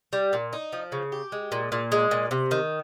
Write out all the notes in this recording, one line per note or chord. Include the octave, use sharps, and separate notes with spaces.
G3
A#2
D#4
F3
C#3
G4
G#3
A#2
A#2
G#3
A#2
C3
D#3